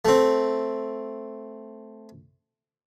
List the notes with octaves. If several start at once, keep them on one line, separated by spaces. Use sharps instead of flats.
A3 C4